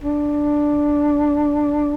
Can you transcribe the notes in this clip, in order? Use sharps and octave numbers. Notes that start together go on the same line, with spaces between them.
D4